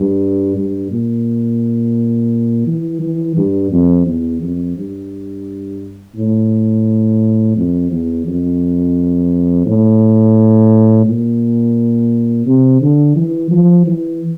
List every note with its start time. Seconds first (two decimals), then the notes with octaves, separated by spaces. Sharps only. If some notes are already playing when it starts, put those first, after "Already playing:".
Already playing: G2
0.56 G2
0.91 A#2
2.66 E3
3.01 E3
3.36 G2
3.71 F2
4.06 E2
4.41 F2
4.77 G2
6.16 A2
7.56 F2
7.91 E2
8.26 F2
9.66 A2
11.06 A#2
12.46 C3
12.81 D3
13.16 E3
13.51 F3
13.86 E3